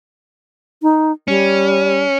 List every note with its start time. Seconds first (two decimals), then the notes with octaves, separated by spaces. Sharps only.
0.83 D#4
1.28 G3 C#4